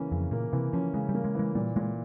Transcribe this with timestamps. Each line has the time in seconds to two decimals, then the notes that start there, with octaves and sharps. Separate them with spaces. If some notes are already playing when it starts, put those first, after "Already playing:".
Already playing: C#3 E3 A#3 C#4
0.12 F2 C#3
0.31 A#2 A#3
0.53 C3 E3
0.73 F3 C#4
0.94 C#3 G#3
1.09 G3
1.14 A#3
1.24 G#3
1.35 E3 G#3
1.55 A#2 G3
1.76 A#2 G#3